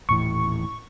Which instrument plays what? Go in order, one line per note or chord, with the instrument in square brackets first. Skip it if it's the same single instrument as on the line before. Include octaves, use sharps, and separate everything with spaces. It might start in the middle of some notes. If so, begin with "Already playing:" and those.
[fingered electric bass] D#1 A2 E3 [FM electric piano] C#6